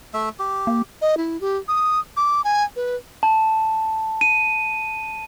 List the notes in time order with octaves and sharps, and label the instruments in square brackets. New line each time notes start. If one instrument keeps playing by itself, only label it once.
[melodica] A3 E5
G4
[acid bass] A#3
[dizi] D#5
E4
G4
D#6
D6
G#5
B4
[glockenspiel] A5
D#7